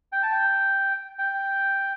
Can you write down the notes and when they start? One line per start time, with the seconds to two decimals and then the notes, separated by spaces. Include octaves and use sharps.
0.12 G5
0.23 A5
0.32 G5
1.19 G5